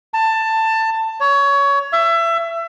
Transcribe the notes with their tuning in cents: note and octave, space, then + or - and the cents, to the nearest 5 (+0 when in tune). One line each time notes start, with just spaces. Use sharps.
A5 +15
C#5 +20
E5 +25